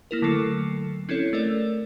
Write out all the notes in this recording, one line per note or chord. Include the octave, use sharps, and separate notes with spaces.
A#3 E4 A#4
D3 F#3 A3 A4 C7 C#7
C4 C#4 E4 A4 C#5
A3 A4 A#4 D5